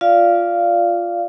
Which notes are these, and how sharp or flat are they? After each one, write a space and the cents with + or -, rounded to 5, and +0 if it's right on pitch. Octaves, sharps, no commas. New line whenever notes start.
F4 +0 D5 -5 F5 -15